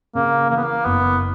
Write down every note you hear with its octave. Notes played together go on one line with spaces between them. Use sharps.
C#3 A#3
E3 A#3
B3
A#3
F#1 B3